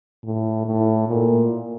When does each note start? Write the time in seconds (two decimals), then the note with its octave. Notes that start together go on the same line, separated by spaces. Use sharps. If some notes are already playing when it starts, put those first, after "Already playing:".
0.24 A2
0.66 A2
1.08 A#2